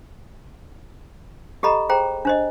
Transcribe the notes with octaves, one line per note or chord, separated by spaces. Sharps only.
G4 A4 D#5 A#5 B5
G#4 C5 G5 A#5
D4 C5 D#5